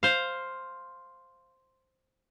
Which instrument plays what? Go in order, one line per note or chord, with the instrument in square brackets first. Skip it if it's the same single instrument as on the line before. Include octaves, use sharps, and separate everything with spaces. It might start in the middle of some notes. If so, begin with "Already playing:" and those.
[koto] C5 F5